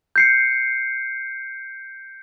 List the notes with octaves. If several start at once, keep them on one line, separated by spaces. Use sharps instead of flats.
G6 C7 C#7